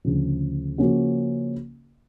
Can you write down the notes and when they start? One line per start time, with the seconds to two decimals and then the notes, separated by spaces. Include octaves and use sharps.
0.05 D2 C#3 F3
0.78 C#3 F3 A#3 C#4 F#4